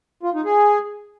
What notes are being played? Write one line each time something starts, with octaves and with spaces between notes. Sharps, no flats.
F4
D#4
G#4